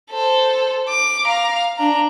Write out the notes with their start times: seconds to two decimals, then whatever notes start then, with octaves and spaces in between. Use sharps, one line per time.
0.11 A4 C5
0.89 D6
1.24 F5 A#5
1.78 D4 A#5